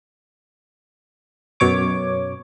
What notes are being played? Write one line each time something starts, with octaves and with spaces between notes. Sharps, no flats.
F#2 B2 C#5 D6